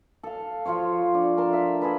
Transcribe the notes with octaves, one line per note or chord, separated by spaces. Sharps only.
A4 F5
F3 F4 C5 C#5
D4
A#4 A5 C6
E5
G#4 A4 B4 D#5